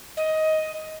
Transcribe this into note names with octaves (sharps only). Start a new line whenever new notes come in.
D#5